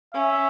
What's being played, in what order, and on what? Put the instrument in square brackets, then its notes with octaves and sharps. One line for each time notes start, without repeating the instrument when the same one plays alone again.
[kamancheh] C#4 [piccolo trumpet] E5